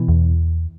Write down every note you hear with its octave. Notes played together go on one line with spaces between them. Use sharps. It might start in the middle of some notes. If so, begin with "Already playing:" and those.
Already playing: B2 E3
E2